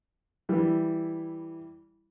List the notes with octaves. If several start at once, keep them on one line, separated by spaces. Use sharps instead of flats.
E3 G3 E4